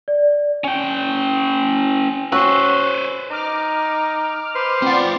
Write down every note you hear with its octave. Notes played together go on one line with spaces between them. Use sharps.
D5
C#4 G5
C#4 F#4 B4 C5 C#6 E6
D#4 D6 F6
B4 C5 C6
C4 F4 D5 F#5 A6